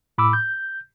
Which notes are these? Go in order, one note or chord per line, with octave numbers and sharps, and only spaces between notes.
A2 B5 D6 E6
G6